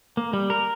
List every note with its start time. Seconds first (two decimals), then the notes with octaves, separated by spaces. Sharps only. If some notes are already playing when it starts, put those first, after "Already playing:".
0.17 A#3
0.33 G3
0.50 A#4